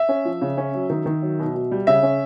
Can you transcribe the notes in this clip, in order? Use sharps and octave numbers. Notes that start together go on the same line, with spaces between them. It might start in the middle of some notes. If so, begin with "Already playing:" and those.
Already playing: E5
C#4
F3
C#3
C#4
F#3
D#3
D#3
F#3
B2
B2
G3
C#3 E5
C#4